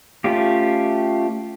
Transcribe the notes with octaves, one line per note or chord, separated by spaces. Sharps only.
A3 C#4 F4 G4